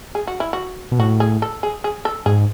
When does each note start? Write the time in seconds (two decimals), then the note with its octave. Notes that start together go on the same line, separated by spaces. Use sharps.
0.15 G#4
0.27 F#4
0.40 E4
0.53 F#4
0.92 B2
0.99 A2 F#4
1.20 G#4
1.42 A4
1.63 G#4
1.84 G#4
2.05 A4
2.26 G#2 G#4